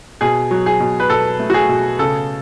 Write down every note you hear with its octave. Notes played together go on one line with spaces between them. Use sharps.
B2 G#4
F#3
G#4
B2
B4
B2 A4
A3
F#4
G#4
B2
C#3 A4